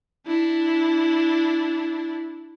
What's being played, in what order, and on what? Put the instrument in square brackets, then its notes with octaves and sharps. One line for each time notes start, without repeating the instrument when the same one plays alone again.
[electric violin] D4 E4